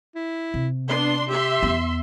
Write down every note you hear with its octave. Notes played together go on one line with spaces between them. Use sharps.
E4
C3
B3 D4 C6
G4 E5 C6
E2 B3